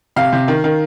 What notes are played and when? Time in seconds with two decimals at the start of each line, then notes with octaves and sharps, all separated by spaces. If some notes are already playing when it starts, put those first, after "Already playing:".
0.16 C3 F5
0.33 C3
0.48 D#3
0.64 D#3